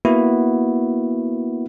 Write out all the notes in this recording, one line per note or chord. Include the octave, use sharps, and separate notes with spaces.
A#3 B3 E4 F#4